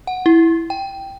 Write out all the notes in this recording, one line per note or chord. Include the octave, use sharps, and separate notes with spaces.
F#5
E4
G5